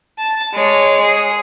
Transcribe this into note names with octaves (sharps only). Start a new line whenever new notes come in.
A5
G#3 C#5
G#4